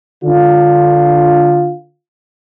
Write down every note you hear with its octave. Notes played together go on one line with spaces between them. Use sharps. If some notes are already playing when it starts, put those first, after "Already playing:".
D3 F4